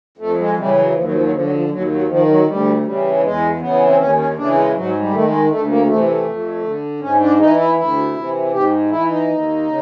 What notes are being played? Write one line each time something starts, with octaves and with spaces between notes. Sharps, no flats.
F2 A3
G#3
C#3 E3 G3
F#3
D#2 F3
F#3
F3
F#3
D3 F3
F#3
F3
D#2 F#3
F#3
D#3 F3
F#3
D2 G3
C#3 E3 G3
E2 G#3
C#3 E3 B3
C4
D#2 C#4
C#4
C#3 E3 D4
G#3
G#2 F#3
F#3
G3
D#3 A3
G#3
D2 A3
A#3
C3 E3 A3
A3
F2
D3
G#2 C#4
D4
E3 D#4
E4
D2 E4
C3 E3
G#2 G4
E3 E4
D#4
D#2
C#3